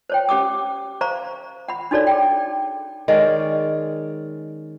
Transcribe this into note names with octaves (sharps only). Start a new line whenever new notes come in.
C5 C#5 G5
C#4 G4 F#5 D6 D#6
C5 F5 A#5 C#6
F#5 B5
D4 D#4 F#4 A4 C#5 D5
G#4 G5
D#3 G#3 C#4 D5